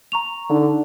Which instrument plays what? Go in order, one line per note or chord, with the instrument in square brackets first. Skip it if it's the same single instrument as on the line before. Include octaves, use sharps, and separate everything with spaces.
[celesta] A#5 C#6 F7
[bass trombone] D3 [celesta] D#4